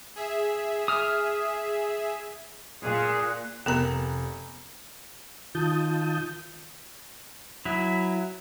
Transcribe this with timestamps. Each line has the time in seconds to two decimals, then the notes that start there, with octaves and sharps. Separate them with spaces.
0.16 G#4 E5
0.88 D#6 F6
2.83 A#2 G#4 F#6
3.66 F1 B3 A#4 A#5
5.55 D#3 F4 A5 D#6 G6
7.65 F#3 E4